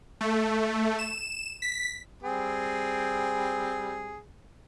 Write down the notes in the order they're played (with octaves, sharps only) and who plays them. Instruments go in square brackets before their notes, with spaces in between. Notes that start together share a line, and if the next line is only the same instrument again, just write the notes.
[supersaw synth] A3
E7
B6
[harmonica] G3 C4 G#4